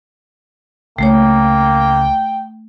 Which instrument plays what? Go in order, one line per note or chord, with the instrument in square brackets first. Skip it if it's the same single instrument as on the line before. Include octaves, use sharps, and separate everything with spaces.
[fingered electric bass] C#2 [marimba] A3 C#5 [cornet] A#3 [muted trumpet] G5